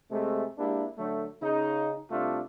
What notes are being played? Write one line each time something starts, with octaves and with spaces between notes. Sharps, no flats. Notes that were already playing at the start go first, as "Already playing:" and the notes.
C3 G#3 A3
G#3 A#3 D4 E4 G4
D3 F#3 A3
C#3 D#4
C2 C3 A3 D4 F4